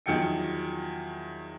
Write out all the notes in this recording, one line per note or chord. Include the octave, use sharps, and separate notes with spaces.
E2 D#3 F3 F#3 G5 C#7